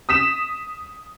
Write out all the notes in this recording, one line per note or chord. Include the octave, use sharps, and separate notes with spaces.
D#6 B6 E7